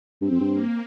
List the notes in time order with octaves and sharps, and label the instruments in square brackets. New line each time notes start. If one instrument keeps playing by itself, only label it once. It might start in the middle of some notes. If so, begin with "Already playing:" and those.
[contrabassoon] G2 [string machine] C4
[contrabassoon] F2
G2
[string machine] A#3